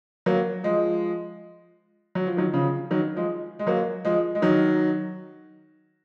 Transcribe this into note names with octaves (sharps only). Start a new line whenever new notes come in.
F#3 A#3
F3 G#3
F#3
F3
D#3 F#3
C#3 F3
D#3 F#3
F3 G#3
G#3
F#3 A#3
F3 G#3
G#3
D#3 F#3